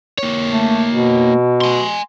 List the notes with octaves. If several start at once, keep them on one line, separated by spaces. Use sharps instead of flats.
A#3 C#5
A3
B2
G#5 C6